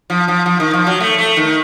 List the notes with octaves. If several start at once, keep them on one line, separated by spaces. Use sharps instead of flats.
F3
F3
F3
D#3
F3
F#3
A3
A3
D#3